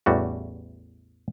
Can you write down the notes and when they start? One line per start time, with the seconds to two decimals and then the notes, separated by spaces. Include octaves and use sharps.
0.06 A1 E2 G3 A3 F#4